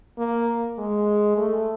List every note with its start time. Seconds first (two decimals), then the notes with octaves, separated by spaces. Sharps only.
0.18 A#3
0.78 G#3
1.37 A3